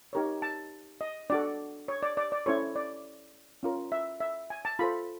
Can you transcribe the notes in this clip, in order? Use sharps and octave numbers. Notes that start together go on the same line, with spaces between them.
D#4 G4 A#4 C#5
A5
D#5
D4 F#4 A4 D5
C#5
D5
D5
D5
C#4 E4 A4 C5 C#5
D5
C#4 F4 A#4
E5
E5
G#5
A5
F4 A4 C5 B5